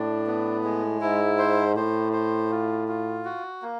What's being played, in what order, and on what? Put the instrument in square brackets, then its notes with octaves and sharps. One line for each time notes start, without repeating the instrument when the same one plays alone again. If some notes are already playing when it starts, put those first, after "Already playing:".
Already playing: [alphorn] A2 [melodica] D4
[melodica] B3
G#3
[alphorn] G#2 [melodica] E4
[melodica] C5
[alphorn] A2 [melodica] C5
[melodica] C5
F4
F4
F#4
A#3